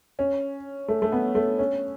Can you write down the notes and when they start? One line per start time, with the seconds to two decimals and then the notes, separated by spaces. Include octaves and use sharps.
0.19 C#4
0.88 A3
1.02 A3
1.12 B3
1.35 A3
1.59 C#4